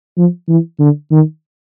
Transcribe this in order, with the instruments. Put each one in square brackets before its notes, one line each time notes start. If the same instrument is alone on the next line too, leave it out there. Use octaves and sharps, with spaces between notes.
[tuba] F3
E3
D3
D#3